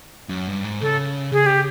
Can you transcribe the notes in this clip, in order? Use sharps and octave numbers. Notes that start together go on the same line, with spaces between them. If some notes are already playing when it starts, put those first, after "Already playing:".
F#2
G2
G#2
C#3 A4
C#3 G#4
G4